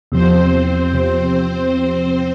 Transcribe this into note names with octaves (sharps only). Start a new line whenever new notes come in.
E2 C3 F3 C4 C5
E2 C3 F3